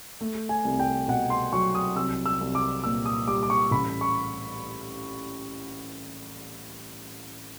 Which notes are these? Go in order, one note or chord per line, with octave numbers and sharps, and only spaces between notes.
A3
G#5
C2
G5
B2 F#5
C6
F#3 C#6
D#6
C2 E6
E6
C2
D6
A#2 E6
D#6
G3 D6
D6
C#6
A1 B5
C#6